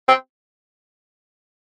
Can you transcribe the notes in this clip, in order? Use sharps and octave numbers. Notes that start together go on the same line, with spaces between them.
C4